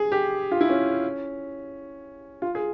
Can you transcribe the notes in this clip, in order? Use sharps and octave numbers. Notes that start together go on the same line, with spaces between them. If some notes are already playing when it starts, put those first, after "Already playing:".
Already playing: G#4
G4
F4
E4
C#4
F4
G#4